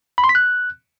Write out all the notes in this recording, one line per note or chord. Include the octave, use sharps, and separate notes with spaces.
B5
C6
B6
F#6